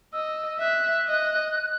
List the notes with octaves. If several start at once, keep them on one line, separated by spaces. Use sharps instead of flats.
D#5 E6
E5 F#6
D#5